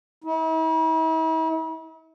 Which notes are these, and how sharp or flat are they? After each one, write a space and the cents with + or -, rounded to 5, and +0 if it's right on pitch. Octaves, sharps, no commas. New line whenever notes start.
E4 -45